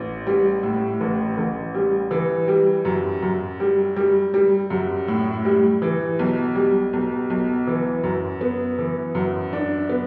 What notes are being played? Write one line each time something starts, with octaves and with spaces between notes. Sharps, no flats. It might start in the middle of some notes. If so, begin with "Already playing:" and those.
Already playing: A1
G3
A2
A1
A1
G3
E3
G3
F#2
F#2
G3
G3
G3
F#2
A2
G3
E3
B1
G3
B1
B1
E3
F#2
B3
E3
F#2
D4
B3